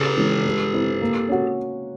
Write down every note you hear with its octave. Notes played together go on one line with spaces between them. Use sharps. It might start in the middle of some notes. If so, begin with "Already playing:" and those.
Already playing: C#3 G4 A4
E3 G#3 C#4
G#3
C4 E4
A#3
C#4 F#4